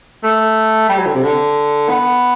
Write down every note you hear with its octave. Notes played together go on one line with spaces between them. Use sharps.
A3
G3
F#3
D3
C3
D3
B3